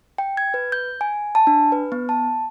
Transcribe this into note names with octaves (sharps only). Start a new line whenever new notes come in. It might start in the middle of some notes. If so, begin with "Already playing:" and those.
G5
G#6
B4
G6
G#5
A5
D4
B4
B3
A5